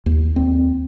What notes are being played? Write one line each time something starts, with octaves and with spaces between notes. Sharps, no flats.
D#2
C4